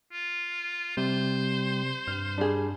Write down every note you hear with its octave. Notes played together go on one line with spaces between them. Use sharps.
F4
C3 G3 C5
G2 F6
G3 D4 G#4